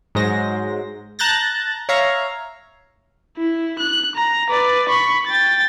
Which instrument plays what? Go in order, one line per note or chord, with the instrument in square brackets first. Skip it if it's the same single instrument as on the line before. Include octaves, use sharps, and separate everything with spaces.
[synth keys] G#2 F#3 G#3 C5 A#6
A5 A#5 F#6 G6 A6 A#6
C#5 E5 F5 A#5
[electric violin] E4
F#6
A#5
B4 D5
B5 C#6
G5 A6